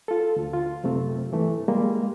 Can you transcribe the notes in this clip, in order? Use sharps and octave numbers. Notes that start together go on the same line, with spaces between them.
F4 A4
D2
F4
F#2 C3 A3 C4
G2 E3 A3
G3 G#3 A#3